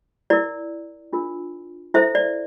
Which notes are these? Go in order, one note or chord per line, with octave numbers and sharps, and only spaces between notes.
E4 A#4 D5
D4 F4 A#4
E4 A4 C5 E5
D5